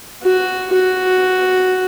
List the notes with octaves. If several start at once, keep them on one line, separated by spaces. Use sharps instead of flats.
F#4
F#4